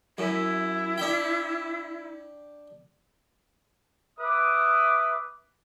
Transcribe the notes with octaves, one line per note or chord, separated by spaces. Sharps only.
F#2 E4
D4 G5
B4 E5 D6 D#6